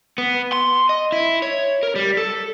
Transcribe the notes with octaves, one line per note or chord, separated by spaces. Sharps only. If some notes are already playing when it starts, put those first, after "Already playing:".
B3
C6
D#5
E4
C#5
A#4
G3
A4